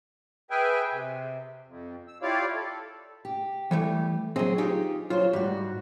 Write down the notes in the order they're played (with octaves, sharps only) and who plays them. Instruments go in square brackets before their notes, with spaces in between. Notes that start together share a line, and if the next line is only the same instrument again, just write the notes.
[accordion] G#4 B4 E5 G5 G#5
C3
F2
E6
E4 F4 G4 C#5 D5 F5
A4
[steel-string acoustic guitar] G4
[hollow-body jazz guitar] E3 G3 A3
[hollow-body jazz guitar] F#3 C4 [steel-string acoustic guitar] G#4 C5 D#5
[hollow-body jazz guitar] D#4 F4 G4 [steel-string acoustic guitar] G#4
[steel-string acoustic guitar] F#3 C5 [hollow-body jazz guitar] F4
[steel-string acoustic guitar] G#2 F#4 [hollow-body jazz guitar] G3